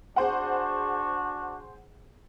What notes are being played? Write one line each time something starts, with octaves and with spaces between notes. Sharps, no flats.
D4 F#4 G#4 C5 F#5